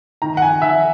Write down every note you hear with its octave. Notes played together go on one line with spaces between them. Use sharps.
D#3 A#5
F#5
G#5
D#3 E5